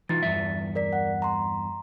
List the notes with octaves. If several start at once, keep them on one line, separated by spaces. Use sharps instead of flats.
E3 D#4 F4 A6
E2 G2 E5
A#4 D5 B6
F#5
A#5 C6